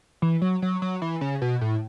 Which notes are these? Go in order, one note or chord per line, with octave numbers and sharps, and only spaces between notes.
E3
F#3
F#3
F#3
E3
C#3
B2
A2